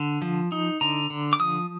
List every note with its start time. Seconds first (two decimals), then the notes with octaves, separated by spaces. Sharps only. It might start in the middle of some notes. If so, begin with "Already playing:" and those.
Already playing: D3
0.22 F3
0.52 D#4
0.81 D3 A#5
1.10 D3
1.33 D6
1.39 F3 D#6